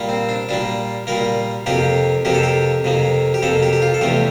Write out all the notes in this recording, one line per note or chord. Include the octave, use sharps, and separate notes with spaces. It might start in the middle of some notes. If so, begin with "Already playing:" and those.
Already playing: A#2 G3 A#3
C4
D4
A#2 G3 A#3 D4
A#2 G3 A#3 A#4
F2 C3 F3 A#3 G4
F2 C3 F3 A#3 G4
A4
G4
F2 C3 F3 A#3
G4
F2 C3 F3 A#3 A4
G4
G4
F4
A4
E2 C3 F3 A3 G4